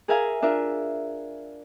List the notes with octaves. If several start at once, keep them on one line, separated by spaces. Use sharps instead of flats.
G#4 A#4 E5 F5 G#5 A#5
D4 F4 A#4 E5